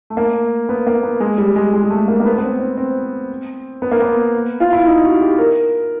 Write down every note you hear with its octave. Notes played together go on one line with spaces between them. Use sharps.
A3
A#3
B3
A#3
B3
G#3
G3
G#3
G#3
G#3
A3
A#3
A#3
B3
B3
C4
C4
C4
B3
A#3
B3
F4
E4
D#4
F#4
G4
A#4